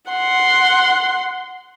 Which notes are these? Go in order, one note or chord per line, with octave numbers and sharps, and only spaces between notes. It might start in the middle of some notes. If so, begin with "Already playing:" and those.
F#5 C6